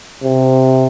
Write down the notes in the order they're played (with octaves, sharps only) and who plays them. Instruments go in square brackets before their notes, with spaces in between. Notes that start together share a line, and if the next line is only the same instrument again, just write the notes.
[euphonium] C3